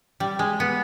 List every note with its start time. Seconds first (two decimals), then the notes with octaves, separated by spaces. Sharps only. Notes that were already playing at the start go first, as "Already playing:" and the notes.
0.20 G3
0.39 G#3
0.60 B3